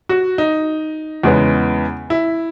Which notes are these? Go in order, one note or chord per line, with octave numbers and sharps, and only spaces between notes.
F#4
D#4
E2 C#3 G#3 B3
E4